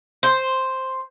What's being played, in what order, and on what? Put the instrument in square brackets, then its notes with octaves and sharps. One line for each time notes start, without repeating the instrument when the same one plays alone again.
[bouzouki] C5